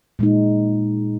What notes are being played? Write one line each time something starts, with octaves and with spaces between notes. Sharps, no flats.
A#2 G#3 D#4